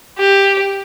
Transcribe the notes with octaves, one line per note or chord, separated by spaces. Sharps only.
G4